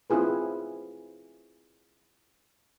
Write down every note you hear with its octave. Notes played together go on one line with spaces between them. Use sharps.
C4 E4 F4 G#4 B4